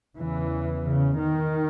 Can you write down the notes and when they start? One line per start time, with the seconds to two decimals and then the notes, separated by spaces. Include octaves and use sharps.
0.17 E2 C#3 E3
0.85 C#3
1.19 D#3